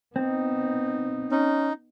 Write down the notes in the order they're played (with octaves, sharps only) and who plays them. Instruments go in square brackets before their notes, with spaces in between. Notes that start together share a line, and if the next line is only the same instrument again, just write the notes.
[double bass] B3 D#4 [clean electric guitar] C4
[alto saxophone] C#4 [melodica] D#4